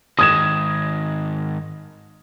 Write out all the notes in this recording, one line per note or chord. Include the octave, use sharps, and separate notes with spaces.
G#2 D#3 D#6 G#6 E7